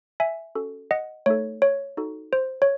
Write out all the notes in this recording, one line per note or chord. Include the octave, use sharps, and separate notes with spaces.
E5 G#5
C#4 F#4 A4
D#5 F#5
A3 D#4 A4 C#5
C#5
D#4 F#4 A4
C5
C#5